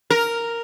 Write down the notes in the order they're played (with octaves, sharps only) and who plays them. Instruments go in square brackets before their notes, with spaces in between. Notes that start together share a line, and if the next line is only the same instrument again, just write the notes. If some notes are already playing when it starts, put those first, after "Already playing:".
[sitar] A#4